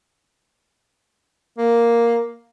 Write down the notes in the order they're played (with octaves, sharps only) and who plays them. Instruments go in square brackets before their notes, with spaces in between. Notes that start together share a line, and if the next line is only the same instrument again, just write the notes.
[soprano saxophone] A#3